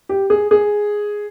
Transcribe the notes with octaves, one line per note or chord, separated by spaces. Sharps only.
G4
G#4
G#4